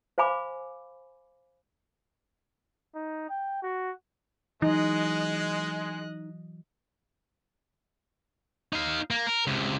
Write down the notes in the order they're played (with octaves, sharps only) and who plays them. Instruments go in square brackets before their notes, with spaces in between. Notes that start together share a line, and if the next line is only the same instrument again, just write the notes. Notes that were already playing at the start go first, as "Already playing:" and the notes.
[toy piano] C5 F5 G#5 B5 D6
[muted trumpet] D#4
G5
F#4
[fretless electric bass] E3 F#3 [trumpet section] G#3 [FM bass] D#4 [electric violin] D#5 F#6
[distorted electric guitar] D#4 F5
A#3
A#4
C#2 C3